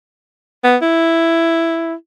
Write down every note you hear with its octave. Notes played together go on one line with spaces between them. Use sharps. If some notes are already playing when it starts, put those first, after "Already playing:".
B3
E4